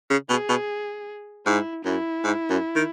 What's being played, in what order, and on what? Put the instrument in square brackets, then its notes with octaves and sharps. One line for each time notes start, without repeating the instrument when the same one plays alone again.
[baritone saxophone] C#3
[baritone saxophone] B2 [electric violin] G#4
[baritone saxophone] B2
[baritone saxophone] G#2 [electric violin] E4
[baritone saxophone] F#2 [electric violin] E4
[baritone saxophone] G#2
F#2
D#3